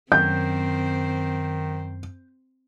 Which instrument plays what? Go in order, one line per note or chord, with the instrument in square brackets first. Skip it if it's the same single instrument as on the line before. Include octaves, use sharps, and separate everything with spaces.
[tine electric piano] F#2 [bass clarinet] D#3 [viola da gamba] C4 C5 [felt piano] G6